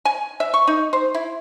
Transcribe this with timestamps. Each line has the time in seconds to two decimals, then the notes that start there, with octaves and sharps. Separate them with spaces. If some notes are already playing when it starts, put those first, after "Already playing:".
0.05 G#5
0.40 E5
0.54 C#6
0.67 D#4
0.93 C5
1.14 E4